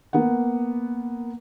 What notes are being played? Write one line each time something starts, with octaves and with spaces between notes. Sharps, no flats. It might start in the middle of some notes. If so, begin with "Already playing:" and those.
A#3 B3 A#4 F#5